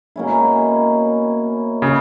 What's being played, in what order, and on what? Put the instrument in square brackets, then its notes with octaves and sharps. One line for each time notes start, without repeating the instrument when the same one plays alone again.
[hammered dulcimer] B2 A#3 C#4 E4
[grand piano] C#3